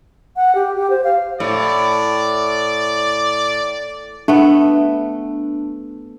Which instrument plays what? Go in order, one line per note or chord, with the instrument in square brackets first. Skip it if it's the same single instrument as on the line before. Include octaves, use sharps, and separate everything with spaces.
[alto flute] F#5
G4
G4
C5
F5
[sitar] A2 [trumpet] D5
[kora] A3 B3 [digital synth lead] D4